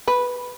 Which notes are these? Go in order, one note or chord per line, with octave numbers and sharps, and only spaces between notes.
B4